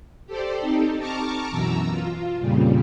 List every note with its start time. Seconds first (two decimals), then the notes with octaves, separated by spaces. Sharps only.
0.27 G4 A4 C5 D5
0.60 C4 D#4 G4 A4
0.99 A5 A#5 C#6 D6 F6
1.51 F#2 B2 E3 A#5 E6
1.90 F4
2.40 F2 A#2 C#3 G3